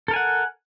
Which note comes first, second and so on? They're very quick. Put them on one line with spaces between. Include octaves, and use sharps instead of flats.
A4 A#4 G#5 F#5